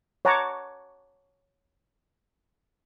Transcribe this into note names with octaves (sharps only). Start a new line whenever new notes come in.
C#5 F#5 A5 A#5 C#6 D6